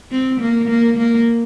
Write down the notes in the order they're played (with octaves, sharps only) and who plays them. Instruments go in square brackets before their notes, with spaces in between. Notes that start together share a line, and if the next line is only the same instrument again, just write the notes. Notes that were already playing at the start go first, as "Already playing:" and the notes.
[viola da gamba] C4
A#3
A#3
A#3